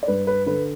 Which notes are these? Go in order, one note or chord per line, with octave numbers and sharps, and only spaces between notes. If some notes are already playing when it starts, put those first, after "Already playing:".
D5
G2 B4
B4
D3 B4